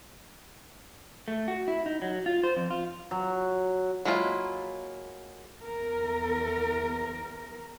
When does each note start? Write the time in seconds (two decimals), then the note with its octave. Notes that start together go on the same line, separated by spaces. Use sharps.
1.28 A3
1.48 F#4
1.68 E4
1.86 D#4
2.02 F#3
2.26 F4
2.44 C5
2.57 F2
2.71 F4
3.11 F#3
4.05 F#3 G#3 A#3 E4 F4
5.64 E2 A#4